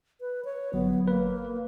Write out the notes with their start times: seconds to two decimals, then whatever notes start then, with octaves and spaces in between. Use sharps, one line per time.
0.21 B4
0.45 C#5
0.74 G1 F#3 B3
1.08 A#3 B4